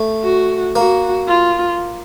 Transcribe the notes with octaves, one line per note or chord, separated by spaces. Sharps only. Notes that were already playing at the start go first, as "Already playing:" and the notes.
Already playing: A3
F#4
A#3 F#4
F4